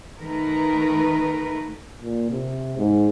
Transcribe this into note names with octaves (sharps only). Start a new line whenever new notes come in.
D#3 A3 A#4 B4
A#2
C3
G#2